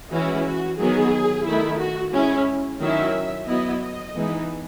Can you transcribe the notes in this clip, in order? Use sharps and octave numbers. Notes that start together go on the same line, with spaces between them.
E3 G#3 C#4 E4 F#4
F#4
D#3 F#3 B3 G#4
D#3 A3 E4
F#4
G#3 C#4 E4
D#3 F#3 C#4 E4 E5
F#3 B3 E4 D#5
D#5
E3 G#3 B3 D#4